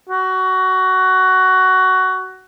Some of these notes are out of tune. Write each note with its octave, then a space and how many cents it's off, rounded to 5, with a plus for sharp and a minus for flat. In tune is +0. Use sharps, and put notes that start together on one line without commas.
F#4 +15